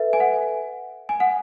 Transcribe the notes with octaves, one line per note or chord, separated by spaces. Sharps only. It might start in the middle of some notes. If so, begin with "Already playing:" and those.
Already playing: A4 B4 E5
G#5
F#5
G#5
F#5